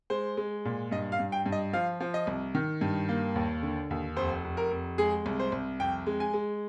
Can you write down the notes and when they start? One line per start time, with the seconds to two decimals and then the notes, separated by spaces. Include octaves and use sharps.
0.10 G#3 C5
0.37 G#3
0.65 A#2
0.91 G2 D#5
1.12 F5
1.20 G2
1.32 G5
1.46 G2
1.52 D#5
1.73 F3 F5
2.00 F3
2.14 D#5
2.27 C2
2.55 D#3
2.81 G2
3.09 A#3
3.35 D#2
3.63 D3
3.90 D#2
4.16 F1 C5
4.44 F1
4.57 A#4
4.71 F1
4.98 G#3 G#4
5.26 C2
5.40 C5
5.52 C2
5.80 F2 G5
6.07 G#3
6.20 G#5
6.33 G#3